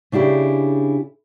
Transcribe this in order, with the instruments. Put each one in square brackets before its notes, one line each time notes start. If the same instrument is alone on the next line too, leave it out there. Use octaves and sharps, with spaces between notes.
[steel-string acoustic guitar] C#3 D4 E4 G4 G#4